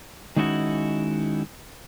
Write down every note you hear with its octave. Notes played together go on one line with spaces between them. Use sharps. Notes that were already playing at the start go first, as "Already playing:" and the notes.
D#3 G#3 C#4 D#4 E4 F#4